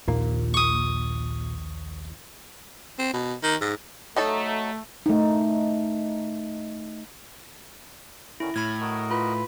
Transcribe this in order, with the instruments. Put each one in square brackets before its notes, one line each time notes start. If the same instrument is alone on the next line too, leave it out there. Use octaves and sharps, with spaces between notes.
[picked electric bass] A#1 D#2 A#3 [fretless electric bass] A#2
[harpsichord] C#6 D#6
[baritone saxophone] C4
B2
D#3
G#2
[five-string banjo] F#3 D#4 A4 [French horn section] A3
[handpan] A3 D#4
[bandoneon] D3 D#3 C#4 [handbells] E4
[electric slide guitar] A2 [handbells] B5 G#6 [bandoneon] F6
[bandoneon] F#4 A#4 D#5
[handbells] F4 [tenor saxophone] B4